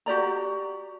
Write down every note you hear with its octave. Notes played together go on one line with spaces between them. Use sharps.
F#4 G4 D5 A#5